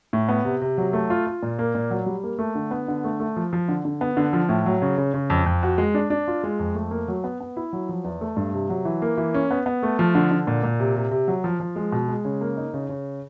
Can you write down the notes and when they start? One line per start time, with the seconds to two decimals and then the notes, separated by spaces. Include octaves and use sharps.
0.13 A2
0.29 B3
0.45 C3
0.62 C3
0.78 F#3
0.93 A3
1.10 F4
1.27 F4
1.43 A#2
1.59 A#3
1.75 A#2
1.91 F#3
2.06 G3
2.24 A#3
2.39 A3
2.55 D3
2.71 B3
2.88 D3
3.04 A3
3.20 A3
3.37 F3
3.53 F3
3.69 D3
3.85 D3
4.01 B3
4.17 D3
4.33 F3
4.49 A2
4.66 F#3
4.82 C#3
4.98 C#3
5.14 C#3
5.30 F2
5.46 F2
5.63 F#4
5.78 G#3
5.94 D4
6.10 D4
6.28 F4
6.44 G#3
6.59 F2
6.75 A3
6.91 A#3
7.08 F#3
7.24 B3
7.41 B3
7.57 E4
7.73 F#3
7.89 F3
8.04 E2
8.21 A3
8.36 G2
8.54 C3
8.70 F#3
8.85 E3
9.02 A#3
9.18 E3
9.34 C#4
9.51 B3
9.66 B3
9.83 A3
9.99 F3
10.15 D3
10.31 D3
10.47 A#2
10.63 A#2
10.80 C3
10.96 C3
11.11 C3
11.28 F#3
11.44 F3
11.60 F3
11.76 G#3
11.92 B2
12.08 G#3
12.25 C#3
12.41 A#3
12.57 D#4
12.74 C#3
12.89 C#3